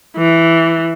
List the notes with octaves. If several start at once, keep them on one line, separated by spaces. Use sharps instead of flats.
E3